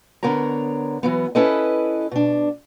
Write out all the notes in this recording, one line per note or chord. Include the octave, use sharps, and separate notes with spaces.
D3 B3 A#4 C#5 A#5
E3 F#3 B3
C#4 E4 A4 B4 D#5
B2 D4